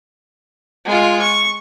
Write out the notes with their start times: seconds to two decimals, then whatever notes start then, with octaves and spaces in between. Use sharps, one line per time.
0.85 G#3 F4
1.22 C#6